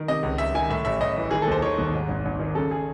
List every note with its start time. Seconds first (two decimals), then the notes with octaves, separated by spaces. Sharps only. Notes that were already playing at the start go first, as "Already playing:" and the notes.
Already playing: D#3
0.08 C3 D#5
0.23 C#2
0.38 C#2 E5
0.55 D#3 G#5
0.70 A2 E5
0.85 A1 E5
1.01 A1 D#5
1.17 E3
1.31 D#3 G#4
1.42 A4
1.47 D#2 C5
1.62 D#3 C#5
1.78 D#2
1.93 G#2
2.08 G#1
2.25 G#1
2.39 D#3
2.55 C#3 A4
2.71 G#4